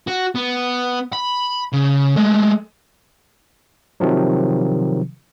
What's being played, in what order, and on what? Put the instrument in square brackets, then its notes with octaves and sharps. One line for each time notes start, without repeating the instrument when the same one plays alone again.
[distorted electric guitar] F#4
B3
B5
C#3
G#3 A3
[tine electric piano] C3 D#3 F3 F#3